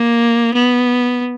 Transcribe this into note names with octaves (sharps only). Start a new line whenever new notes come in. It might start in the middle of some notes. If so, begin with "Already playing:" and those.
Already playing: A#3
B3